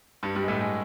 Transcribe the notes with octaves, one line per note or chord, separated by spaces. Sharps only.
G2 G3
G2 G3
G#3
A2 A3
G#3